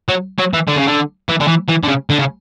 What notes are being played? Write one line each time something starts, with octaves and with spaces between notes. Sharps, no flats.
F#3
F#3
E3
D3
C#3
D3
E3
D3
E3
E3
D3
C#3
D3
C#3